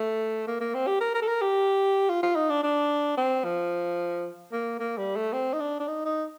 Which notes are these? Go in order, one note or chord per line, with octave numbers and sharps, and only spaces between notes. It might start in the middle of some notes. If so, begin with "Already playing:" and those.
Already playing: A3
A#3
A#3
C4
G4
A#4
A#4
A4
A#4
G4
F4
F4
D#4
D4
D4
C4
F3
A#3
A#3
G3
A3
C4
D#4
D4
D4
D#4
D#4